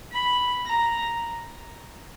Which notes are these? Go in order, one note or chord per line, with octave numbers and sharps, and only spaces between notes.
B5
A#5